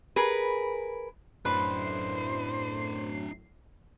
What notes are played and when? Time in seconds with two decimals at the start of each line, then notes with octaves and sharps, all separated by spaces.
0.16 G#4 A#4 B4
1.45 F#2 A2 D4 E4 B4 C5 C7